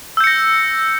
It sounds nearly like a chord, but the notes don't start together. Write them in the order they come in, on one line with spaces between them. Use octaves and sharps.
E6 G6 C#7 A#6